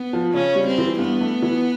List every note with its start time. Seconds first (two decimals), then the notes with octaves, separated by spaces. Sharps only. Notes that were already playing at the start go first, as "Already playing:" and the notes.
Already playing: B3
0.13 F3
0.34 C#3 C#4
0.55 G3
0.67 C4
0.78 E3
0.99 G2 B3
1.21 A3
1.42 E3